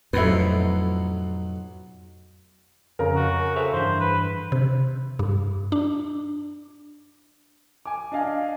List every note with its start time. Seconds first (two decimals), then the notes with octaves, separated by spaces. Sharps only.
0.13 B1 F2 A2 F#3 B4 E5 C6
2.99 F2 C#3 A#4
3.16 F#4
3.56 G#4 A4 C5 E5
3.73 G2 E3 D4 C5
4.01 B4
4.52 C3
5.19 G2
5.72 D4
7.86 G#5 D6
8.12 D4 D#5 F5 G#5